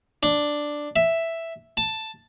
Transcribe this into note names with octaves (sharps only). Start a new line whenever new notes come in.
D4
E5
A5